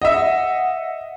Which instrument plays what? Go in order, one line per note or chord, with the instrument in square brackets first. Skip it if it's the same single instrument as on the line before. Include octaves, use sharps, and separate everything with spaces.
[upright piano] D#5 E5 [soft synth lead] F#5